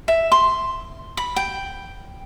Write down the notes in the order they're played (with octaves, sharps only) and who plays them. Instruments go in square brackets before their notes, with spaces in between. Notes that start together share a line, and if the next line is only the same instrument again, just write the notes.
[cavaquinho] E5
C6
B5
G5